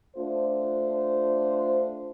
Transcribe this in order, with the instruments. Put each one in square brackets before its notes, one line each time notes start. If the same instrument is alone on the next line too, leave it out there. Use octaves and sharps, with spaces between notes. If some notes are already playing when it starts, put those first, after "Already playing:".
[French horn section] A3 D4 F4 C5